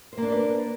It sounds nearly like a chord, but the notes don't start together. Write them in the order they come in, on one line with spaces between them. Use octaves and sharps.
C5 A#3 D4 D5 B4